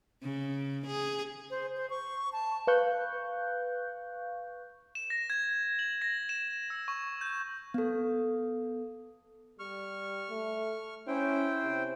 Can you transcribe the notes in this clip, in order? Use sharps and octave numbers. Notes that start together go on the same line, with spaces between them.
C#3
G#4
C5
C5
C#6
A5
B4 F5 C#6 F#6 G6
E7
A#6
G#6
F#7
A#6
E7
E6
C#6
G6
B3 A4
G3 C#6 F6
A3
C#4 E4 C5 G5
C3